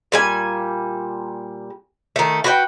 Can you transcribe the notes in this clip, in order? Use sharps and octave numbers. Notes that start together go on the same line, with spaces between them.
A#2 G3 G#5
D#3 A3
F#4 B4 C#5 G5